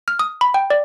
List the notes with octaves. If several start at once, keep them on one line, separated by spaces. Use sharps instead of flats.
F6
D#6
B5
G5
D5